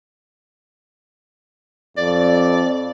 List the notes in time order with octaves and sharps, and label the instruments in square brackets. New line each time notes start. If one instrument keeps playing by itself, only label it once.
[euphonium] F2 [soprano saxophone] D5